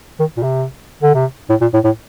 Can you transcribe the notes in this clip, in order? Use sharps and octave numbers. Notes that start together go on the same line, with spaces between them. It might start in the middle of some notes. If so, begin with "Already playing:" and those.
D#3
A#2
C3
D3
C3
A2
A#2
A2
A2